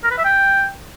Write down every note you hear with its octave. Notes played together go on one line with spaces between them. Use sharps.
A#4
B4
E5
G5